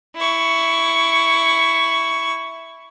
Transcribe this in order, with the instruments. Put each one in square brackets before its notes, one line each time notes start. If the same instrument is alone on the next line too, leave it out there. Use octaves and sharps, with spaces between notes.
[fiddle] E4 C#6